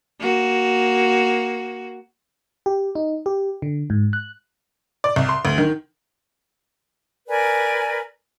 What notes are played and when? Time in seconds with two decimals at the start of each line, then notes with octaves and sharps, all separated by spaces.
0.19 A#3 F#4
2.66 G4
2.95 D#4
3.26 G4
3.62 D3
3.90 G#2
4.13 F#6
5.04 D5
5.16 C2
5.29 C6
5.45 D2
5.58 D#3
7.27 A#4 B4 D5 G#5